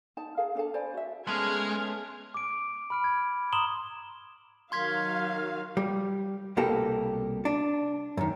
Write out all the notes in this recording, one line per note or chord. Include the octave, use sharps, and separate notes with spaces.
D#4 A5
G#4 A#4 F5
D4 A4 F5 A5
C5 D5 G#5 B5
F#4 E5
G#3 A3 B3 C#4 G#4 F6 G#6
D6 D7
B5 F6 D7
G#6
A#5 C6 D#6 E7 F#7 G7
D#3 F#3 F5 C6 G#6 B6
G3
C2 B2 A#3 G4 A4
D4
F#2 D#3